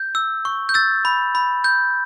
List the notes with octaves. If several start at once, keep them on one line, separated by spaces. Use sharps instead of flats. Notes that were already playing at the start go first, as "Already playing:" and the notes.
Already playing: G6
E6
C#6
G6
E6 A6
B5
B5
G6